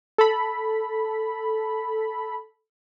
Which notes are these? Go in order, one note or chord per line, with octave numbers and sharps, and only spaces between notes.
A4 B5